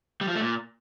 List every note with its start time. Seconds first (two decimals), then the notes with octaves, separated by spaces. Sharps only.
0.21 G3
0.28 F3
0.35 A3
0.42 A#2